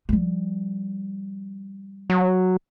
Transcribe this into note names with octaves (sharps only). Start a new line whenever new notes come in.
F3 G3
F#3